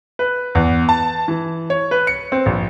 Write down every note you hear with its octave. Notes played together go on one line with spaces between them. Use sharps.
B4
E2
A5
E3
C#5
B4
C#7
C4
A#1